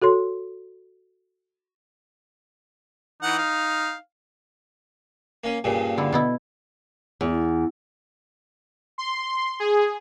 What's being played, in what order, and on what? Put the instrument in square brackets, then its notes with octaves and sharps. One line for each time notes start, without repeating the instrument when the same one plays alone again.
[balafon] F#4 A4 C#5 C6
[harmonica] E3 F#5 [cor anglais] D#4
[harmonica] F5
[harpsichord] A#3 C#4
G2 A#2 C#3
[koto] D3 E4
B2 B3 E4
[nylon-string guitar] E2
[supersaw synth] C6
G#4